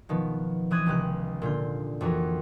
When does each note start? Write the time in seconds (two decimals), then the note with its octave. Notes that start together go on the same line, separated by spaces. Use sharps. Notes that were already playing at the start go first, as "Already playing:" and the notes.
0.09 B2 D#3 F3 B3
0.71 E3 C4 D#6 F#6 G#6
0.86 C#2 C3 D#3 G4 F#6
1.42 A#2 D3 F4 G6
2.01 F2 E3 F#4 A#4